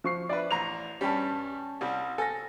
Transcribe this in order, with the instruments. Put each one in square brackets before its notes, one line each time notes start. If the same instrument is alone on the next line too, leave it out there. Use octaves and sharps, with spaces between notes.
[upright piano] F3 C#6 C7
[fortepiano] D4 B4 [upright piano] D5 E5
[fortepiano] A1 A#5 [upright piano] F7
[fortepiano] G2 G3 [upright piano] C#4 A5
[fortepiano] C2 G3
[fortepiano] A4 [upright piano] G#5 A#6